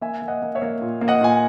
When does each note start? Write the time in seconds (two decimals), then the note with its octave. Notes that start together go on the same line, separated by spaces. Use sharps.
0.01 A#3 E5 G#5
0.22 A#3
0.28 D#5 F#5
0.42 A#3
0.55 C#5 E5
0.62 A#3
0.81 A#2
1.01 A#3
1.08 D#5 F#5
1.21 A#2 G#5